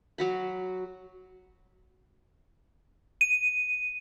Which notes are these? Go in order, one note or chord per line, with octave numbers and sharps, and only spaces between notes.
F#3 F#4 B5
D#7